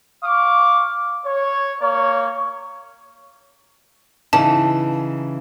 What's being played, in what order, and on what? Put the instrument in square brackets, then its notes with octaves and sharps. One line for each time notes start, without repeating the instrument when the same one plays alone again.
[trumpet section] F5 C#6 D6
C#5
A#3 C#5
[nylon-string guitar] C#3 E3 D#4 [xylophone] A5